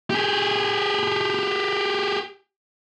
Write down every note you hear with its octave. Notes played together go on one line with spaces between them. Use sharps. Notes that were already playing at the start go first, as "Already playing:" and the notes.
G4 G#4